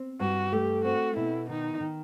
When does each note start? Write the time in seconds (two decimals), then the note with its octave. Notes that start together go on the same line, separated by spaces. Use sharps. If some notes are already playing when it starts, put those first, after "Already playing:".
Already playing: C4
0.20 G2 F#4
0.52 A3 G4
0.84 C4 F#4
1.16 B2 E4
1.49 D#3 D#4
1.80 D#3